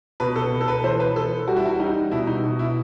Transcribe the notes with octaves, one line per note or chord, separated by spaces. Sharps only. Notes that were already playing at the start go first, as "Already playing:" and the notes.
B2 B4
A4
B2
A4
B4
E3 C5
B4
E3 A4
G3 F#4
E4
F#4
G3 D#4
B2 E4
D#4
B2
E4